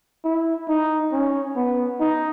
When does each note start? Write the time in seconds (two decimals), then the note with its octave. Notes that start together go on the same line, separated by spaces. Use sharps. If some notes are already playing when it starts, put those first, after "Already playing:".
0.25 E4
0.68 D#4
1.12 C#4
1.56 B3
2.00 D#4